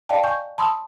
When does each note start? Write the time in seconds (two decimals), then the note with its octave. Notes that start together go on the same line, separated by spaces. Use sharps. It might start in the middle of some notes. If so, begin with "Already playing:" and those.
0.09 D5 D#5 F5 G5 A5
0.23 G#5 C#6 G6
0.58 A5 B5 C6 D#6 E6